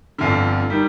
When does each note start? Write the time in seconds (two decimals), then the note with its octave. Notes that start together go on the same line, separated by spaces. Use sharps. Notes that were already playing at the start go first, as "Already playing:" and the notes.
0.18 G1 F2 D3
0.70 D#3 G3